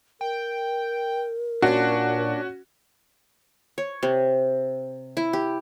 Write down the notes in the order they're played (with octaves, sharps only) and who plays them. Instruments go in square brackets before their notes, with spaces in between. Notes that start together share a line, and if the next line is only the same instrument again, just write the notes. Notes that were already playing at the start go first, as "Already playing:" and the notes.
[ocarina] A#4 [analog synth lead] G5
[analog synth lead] A#2 [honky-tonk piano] C#4 F#4 [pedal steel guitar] D4
[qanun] C#5
C3
E4
G4